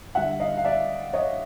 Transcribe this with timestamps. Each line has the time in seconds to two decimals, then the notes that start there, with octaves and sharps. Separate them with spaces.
0.15 D3 G3 E5 F#5
0.40 D#5 F5
0.57 F5
0.65 D5 E5
1.13 C#5 D#5